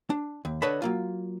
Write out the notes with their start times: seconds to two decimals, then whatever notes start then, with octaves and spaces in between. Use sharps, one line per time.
0.10 D4
0.45 D#2
0.62 D3 B4 C#5 D#5 A5 B5
0.82 F#3 A#3 F4